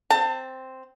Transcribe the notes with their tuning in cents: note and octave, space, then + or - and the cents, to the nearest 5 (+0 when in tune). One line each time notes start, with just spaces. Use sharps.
C4 +0 A5 +30